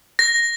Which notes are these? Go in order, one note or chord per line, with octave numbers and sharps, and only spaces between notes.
A#6